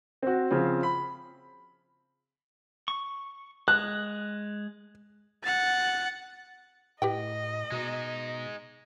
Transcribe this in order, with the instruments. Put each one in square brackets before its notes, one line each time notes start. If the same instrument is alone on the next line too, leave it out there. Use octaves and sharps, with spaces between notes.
[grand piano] C4 F#4
C#3 F3 C4
B5
[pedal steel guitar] C#6
[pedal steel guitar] G#3 [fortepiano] F#6
[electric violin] F#5 A6
[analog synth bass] A2 [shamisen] G4 B4 G5 [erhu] D#5
[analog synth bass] B2 [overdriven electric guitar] G#3 D#4